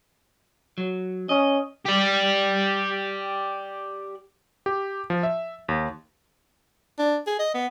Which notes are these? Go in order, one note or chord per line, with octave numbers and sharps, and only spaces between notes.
F#3
C#4 D#5
G4 D5
G4
F3
E5
D#2
D4
G#4
D#5
B3